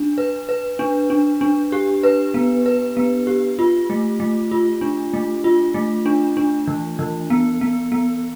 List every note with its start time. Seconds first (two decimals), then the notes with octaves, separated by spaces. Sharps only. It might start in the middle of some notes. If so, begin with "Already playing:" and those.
Already playing: D4
0.18 B4
0.49 B4
0.79 D4
1.10 D4
1.41 D4
1.72 G4
2.03 B4
2.34 B3
2.66 B4
2.97 B3
3.27 G4
3.59 F4
3.90 A3
4.20 A3
4.51 F4
4.81 D4
5.14 A3
5.44 F4
5.74 A3
6.06 D4
6.37 D4
6.68 E3
6.99 E3
7.30 B3
7.61 B3
7.92 B3